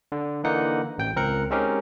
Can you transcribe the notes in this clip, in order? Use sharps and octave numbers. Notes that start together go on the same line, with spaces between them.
D3
D3 E3 A#3 D#4 F#5
A1 G5 G6
C#2 C4 A#4 F#6 C#7
G#3 C4 C#4 D#4 G4 A#4